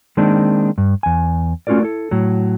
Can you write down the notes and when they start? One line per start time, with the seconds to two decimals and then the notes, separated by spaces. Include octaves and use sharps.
0.17 D#3 G#3 A#3 C4 D4 D#4
0.78 G2
1.03 E2 G#5
1.67 A3 C#4 F4 F#4 A#4 D5
1.83 E4 A4
2.11 A2 F#3